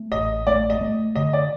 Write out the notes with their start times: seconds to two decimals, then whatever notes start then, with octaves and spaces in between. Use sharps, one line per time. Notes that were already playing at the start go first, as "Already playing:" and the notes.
Already playing: A3
0.12 A1 D#5
0.47 A3 D5
0.70 D#5
0.81 A3
1.16 D3 D#5
1.33 D5